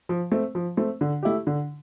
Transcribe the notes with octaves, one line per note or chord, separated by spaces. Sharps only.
F3
A3 C4
F3
A3 C4
D3
A3 E4 G4
D3